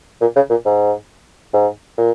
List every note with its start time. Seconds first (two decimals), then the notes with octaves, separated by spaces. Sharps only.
0.21 A#2
0.36 C#3
0.50 A#2
0.65 G#2
1.54 G#2
1.98 A#2